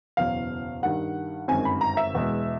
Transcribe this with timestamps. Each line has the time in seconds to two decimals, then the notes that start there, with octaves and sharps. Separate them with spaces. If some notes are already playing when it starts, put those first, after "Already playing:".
0.17 F#1 E2 B2 F#3 F5
0.82 G2 D#3 G3 F#5
1.48 G1 F#2 D#3 G#3 C4 G#5
1.65 B5
1.81 A#5
1.97 E5
2.13 E1 E2 B2 G#3